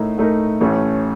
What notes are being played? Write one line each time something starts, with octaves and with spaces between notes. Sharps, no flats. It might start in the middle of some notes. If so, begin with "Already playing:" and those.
Already playing: A2 A3 D#4 A#4
A2 A3 D#4 A#4
A1 A2 A3 C#4